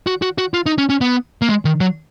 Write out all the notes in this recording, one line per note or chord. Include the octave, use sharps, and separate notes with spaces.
F#4
F#4
F#4
F4
D#4
C#4
C#4
B3
A#3
G#3
D#3
F#3